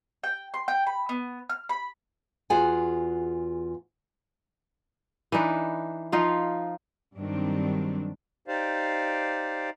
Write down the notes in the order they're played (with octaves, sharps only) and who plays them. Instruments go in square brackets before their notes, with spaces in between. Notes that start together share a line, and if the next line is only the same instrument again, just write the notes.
[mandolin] G5
C6
G5
B5
B3
F6
B5
[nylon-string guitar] E2 F4 F#4 G#4 F#5 G#5
[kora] E3 D4 D#4 B4
F3 D#4 F4
[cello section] G2 D#3 F#3 G3 C4 D4
[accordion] D#4 G4 C5 D5 F5